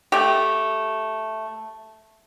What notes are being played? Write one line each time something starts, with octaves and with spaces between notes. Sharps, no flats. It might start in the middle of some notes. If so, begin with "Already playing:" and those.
A3 G4